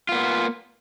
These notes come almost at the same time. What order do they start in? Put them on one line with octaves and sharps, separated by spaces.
F4 B3 A#3